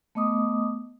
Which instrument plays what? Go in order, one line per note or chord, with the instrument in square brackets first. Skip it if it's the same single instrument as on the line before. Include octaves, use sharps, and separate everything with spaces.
[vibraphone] A3 B3 D#5 D6 D#6